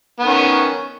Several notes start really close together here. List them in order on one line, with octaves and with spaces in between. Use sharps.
B3 D#3 C#4